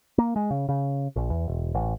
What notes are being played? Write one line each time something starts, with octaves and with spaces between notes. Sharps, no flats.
A#3
G#3
C#3
C#3
A#1
E2
E1
A1